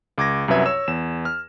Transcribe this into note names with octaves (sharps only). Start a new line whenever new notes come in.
C#2 D6 G#6 A#6
C2 F#2 F#3 B4 E5 G#6
C#5 E6 E7
E2 E7
F6